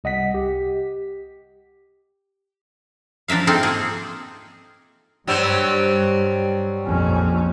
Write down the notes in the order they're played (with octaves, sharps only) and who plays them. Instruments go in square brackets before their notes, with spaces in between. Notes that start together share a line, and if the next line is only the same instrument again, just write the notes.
[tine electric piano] C2 D#5 F#5 B6
G4
[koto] F3 D4 A#4 E5 F5
C4 D#4 F4 G#4 A4
A#3 G#4
[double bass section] G2 [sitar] F#3 G3 C4
[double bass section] A#1 F2 C#4